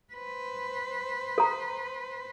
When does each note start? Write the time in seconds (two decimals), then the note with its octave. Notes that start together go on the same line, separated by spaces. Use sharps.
0.14 B4 C5
1.38 A4 A#5